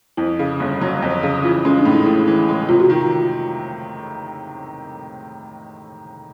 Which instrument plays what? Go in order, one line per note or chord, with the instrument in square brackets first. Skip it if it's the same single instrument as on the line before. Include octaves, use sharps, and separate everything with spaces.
[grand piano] F2 [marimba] E4
[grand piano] C#3
G1
F#3
F2
C#3
[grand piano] E3 [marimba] F4
[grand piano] G#3 [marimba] C#4
[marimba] D4
[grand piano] A2
[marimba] D#4
[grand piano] A2 [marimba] E4
[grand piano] E3
G#3
[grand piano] C3 [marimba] F4
[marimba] F#4
[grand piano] D#3 [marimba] F4